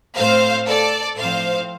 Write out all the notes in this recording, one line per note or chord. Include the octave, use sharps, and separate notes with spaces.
A2 A3 C4 C5 F5
A4 D5
A2 F3 C4 C5 F5